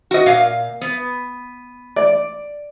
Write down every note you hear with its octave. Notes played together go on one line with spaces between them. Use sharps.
F#4 D#5
A#2 F5
B3
D5